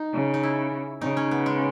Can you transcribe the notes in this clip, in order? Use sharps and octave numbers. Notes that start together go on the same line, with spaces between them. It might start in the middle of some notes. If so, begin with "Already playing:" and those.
Already playing: D#4
C#3
D#4
E4
C#3 D#4
C#4
B3
G#3